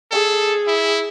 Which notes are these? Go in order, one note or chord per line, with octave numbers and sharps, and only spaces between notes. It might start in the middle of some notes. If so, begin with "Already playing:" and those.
G#4 A4
E4